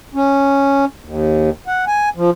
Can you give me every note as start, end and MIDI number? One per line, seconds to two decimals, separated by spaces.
0.15 0.85 61
1.04 1.50 39
1.67 1.85 78
1.87 2.09 80
2.17 2.30 53